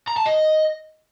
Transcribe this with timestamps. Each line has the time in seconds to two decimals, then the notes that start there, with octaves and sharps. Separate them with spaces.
0.08 A#5
0.17 A5
0.26 D#5